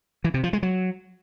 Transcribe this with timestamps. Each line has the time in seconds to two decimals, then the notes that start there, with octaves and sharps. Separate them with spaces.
0.24 E3
0.34 C3
0.44 F3
0.53 G#3
0.63 F#3